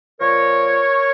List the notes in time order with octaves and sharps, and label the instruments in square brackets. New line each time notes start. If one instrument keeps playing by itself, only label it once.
[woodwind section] A#2 F3 A#4 C#5